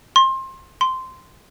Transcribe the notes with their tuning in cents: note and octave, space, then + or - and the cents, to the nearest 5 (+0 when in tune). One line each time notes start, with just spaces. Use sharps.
C6 +25
C6 -10